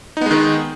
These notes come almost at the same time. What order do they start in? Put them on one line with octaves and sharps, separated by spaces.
D#4 B3 G#3 D#3